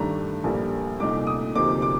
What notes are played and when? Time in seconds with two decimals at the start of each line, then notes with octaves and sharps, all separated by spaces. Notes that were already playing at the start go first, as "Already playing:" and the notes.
Already playing: G2 D#3 A3 D4 A#5
0.44 A#1 A2 G3 A#3
1.00 C2 A#2 A3 D#4 D6
1.27 D#6
1.55 D2 C3 F3 A#3 D#4 D6
1.82 D6